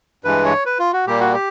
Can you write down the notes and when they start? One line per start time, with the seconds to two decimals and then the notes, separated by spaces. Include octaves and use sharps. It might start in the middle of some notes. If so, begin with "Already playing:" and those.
0.25 G2 E3 G#3 B4
0.45 C#5
0.66 B4
0.79 F4
0.93 F#4
1.07 A#2 G3 A#3 G4
1.20 F#4
1.34 G4